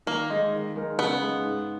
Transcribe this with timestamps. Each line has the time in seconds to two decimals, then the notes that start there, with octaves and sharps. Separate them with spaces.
0.06 D#3 A#3
0.30 G#3 D#4 G#4 D#5
0.53 D#3
0.76 G#3 D#4 A#4
0.99 C#3 B3
1.21 G#3 D#4
1.45 G#2